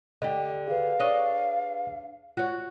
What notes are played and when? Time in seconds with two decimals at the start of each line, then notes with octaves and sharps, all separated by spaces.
0.22 D3 G4 D#5
0.68 G#4 B4 F5
0.99 D4 C#5 D#5
2.37 F4 F#4 C#5